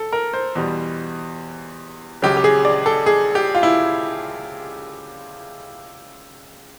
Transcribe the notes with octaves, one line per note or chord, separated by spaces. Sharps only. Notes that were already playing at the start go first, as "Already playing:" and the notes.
Already playing: A4
A#4
C5
E2 B2 G3
C#2 C#3 F#3 G4
G4
G#4
D5
A4
G#4
G4
F4
E4